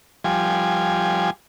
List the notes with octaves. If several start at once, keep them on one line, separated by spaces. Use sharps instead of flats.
F3 G3 G#5